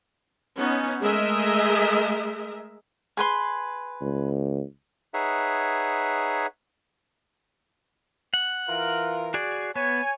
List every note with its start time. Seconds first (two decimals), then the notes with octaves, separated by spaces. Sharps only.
0.57 B3 C#4 D#4
1.01 G#3 A3 G#4 A#4 D#5 E5
3.17 G#4 B4 C6
4.01 C#2
5.14 D#4 G#4 B4 C#5 E5 F#5
8.34 F#5
8.69 E3 F4 A#4
9.34 F#4 G#4 D5
9.76 B3 C#5 G#5